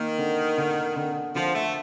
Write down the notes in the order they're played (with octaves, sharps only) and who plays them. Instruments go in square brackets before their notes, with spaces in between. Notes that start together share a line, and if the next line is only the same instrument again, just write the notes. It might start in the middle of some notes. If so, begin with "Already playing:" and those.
Already playing: [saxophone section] D#3 [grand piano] A#3
[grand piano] D3
D3
D3
[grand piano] D3 [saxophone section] F3
[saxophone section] A3